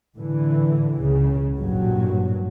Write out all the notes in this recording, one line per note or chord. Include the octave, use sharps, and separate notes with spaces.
A2 D3 E3
C#2 C#3
A1 G2 A#2 F#3